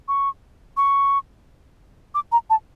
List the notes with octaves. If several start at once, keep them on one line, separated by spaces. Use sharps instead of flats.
C#6
C#6
D6
A#5
A5